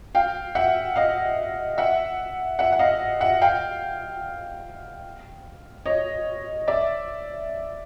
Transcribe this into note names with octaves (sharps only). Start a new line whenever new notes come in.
F5 G5
E5 F#5
D#5 F5
E5 F#5
E5 F#5
F#5
D#5 F5
E5 F#5
F5 G5
C#5 D#5
D5 E5